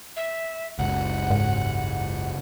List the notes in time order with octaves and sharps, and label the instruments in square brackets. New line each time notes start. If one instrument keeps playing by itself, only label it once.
[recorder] E5
[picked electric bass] F#1 C#2 [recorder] F#5
[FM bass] G#2